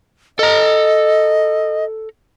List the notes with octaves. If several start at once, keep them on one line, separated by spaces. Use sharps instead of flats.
A4 D#5 A#5